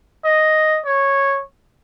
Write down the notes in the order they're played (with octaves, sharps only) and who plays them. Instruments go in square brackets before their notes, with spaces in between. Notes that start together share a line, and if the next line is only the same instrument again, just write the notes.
[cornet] D#5
C#5